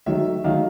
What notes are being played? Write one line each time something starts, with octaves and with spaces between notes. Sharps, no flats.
D#3 F#3 A3 E5
D#3 F#3 A3 F5